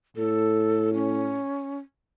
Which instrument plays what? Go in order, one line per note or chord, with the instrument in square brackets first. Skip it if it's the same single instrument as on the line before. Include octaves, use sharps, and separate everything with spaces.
[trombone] A2 [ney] A4
[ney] C#4